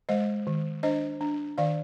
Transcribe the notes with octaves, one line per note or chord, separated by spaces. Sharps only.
G#3 C5 D#5
D#3
D4 C5 D#5
D4
D#3 D5 F5